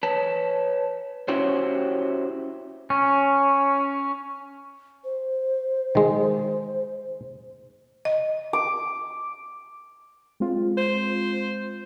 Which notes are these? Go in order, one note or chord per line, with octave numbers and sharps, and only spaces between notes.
B4 C#5 A5
C#4 E4 F#4 G4 C5 C#5
C#4
C5
D#3 G#3
D#5
D6
G#3 C4 F4
C5